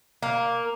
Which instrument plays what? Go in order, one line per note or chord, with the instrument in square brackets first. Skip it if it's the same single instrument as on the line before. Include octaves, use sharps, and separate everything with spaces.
[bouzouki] A#3